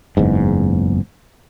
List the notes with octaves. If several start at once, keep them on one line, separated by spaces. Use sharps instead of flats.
F#1 E2 G#2